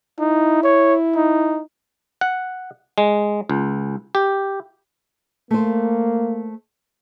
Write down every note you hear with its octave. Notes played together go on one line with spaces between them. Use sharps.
D#4 E4
C#5
D#4
F#5
G#3
C#2
G4
A3 A#3 C5